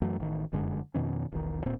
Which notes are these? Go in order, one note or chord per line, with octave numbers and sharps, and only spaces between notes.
F#2 E3 F#3 A3
A1 D#3
F1 F#2 D3 G#3
F2 B2 D#3 C#4
E1 B1 D#3
D1 A#2 C4